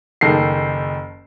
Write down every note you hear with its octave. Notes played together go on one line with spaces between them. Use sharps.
F#1 D#3 A4 C7